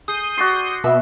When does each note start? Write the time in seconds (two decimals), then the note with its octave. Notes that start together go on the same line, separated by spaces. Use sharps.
0.08 G#4 D#6 G6 C7
0.37 F#4 D5 C6
0.84 B2 E5